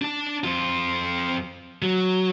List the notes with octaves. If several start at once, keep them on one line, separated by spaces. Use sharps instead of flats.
D4 A5
F2 F4
F#3